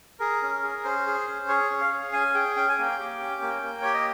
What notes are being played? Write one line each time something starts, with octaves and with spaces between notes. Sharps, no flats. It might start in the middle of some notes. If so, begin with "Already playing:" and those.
G#4 A#4
C#4
G#4
C#4 C5
G#4
C#4
G#4 C#5
C#4
F5
G#4
C#4 G#5
G#4 G5
C#4 G5
G#5
A#3 G5
G4
C#4
A#3
A#3
G4 C#5
D#5